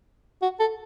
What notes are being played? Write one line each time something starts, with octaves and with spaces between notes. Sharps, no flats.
F#4
A4